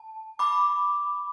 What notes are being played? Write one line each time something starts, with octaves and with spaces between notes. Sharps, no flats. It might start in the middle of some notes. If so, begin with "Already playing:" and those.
Already playing: A5
B5 D6